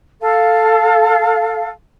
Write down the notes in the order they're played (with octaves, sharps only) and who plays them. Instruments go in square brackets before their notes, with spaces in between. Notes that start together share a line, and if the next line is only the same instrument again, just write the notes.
[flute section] A4 F5